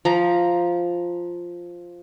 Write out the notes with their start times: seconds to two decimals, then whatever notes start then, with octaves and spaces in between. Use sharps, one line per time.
0.05 F3 A#5